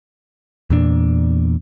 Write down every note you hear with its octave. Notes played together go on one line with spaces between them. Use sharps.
E2 A#2 D4